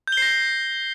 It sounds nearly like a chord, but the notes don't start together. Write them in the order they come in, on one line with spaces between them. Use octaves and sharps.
G6 G7 C7 A#6